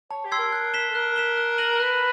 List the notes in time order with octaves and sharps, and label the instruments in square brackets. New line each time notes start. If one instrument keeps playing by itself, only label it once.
[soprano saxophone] C#5 [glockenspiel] A5
[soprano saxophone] G4
[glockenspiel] C6 E6 G#6 C7
[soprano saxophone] A#4
[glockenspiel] F#6
B6 E7 G7
[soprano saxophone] A4
[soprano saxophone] A#4 [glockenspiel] F#6
[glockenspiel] B6 E7 G7
F#6
A#6 D#7 F#7
[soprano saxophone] B4 [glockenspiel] F#6